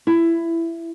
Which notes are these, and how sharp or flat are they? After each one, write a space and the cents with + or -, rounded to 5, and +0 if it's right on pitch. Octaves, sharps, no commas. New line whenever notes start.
E4 +15